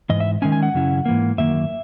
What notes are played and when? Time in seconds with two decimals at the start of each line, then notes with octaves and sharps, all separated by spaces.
0.09 G#2 E3 D#5
0.20 E5
0.42 D#3 G#3 C#4 G#5
0.52 G#5
0.63 F#5
0.74 F#2 C#3 F#3 C#4 E4
1.05 G#2 E3 A#3
1.38 F#2 D#3 A#3 E5